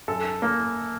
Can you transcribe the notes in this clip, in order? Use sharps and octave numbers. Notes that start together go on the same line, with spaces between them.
F#2 A4
A#3